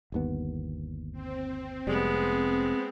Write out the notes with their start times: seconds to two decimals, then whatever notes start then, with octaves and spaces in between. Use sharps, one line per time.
0.12 G1 D#2 B3
1.12 C4
1.87 F1 G3 G#3 B3